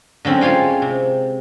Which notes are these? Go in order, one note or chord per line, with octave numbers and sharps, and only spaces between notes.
D3 F#3 C4 C#4
G#3 F4 C#5 F5 G5
C3